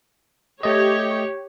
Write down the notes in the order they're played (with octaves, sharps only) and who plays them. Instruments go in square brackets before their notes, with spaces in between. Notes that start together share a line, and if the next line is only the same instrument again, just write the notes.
[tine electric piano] A3 D#5 [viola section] G4 C#5